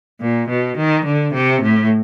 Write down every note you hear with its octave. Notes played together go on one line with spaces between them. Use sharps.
A#2
B2
D#3
D3
C3
A2